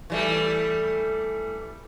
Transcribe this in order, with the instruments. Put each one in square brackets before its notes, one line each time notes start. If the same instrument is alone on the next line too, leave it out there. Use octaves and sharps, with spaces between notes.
[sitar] E3 G3 A3